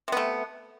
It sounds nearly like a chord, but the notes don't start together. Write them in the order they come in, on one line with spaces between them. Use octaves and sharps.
C3 B3 A3